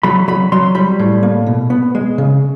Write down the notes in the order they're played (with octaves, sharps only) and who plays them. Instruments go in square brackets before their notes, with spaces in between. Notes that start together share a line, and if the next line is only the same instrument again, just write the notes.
[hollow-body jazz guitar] F#3 B5
F#3 B5
F#3 C6
G3 B5
A2
A#3
B2
B3
G#3
C#3